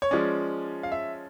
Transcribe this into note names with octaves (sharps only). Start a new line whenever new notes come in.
C#5
F3 G#3 C#4 D5
F5
E5